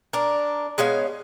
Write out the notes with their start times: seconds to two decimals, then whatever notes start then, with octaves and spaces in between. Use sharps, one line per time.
0.13 D4 A#4
0.78 G#3 B3 C#4 F5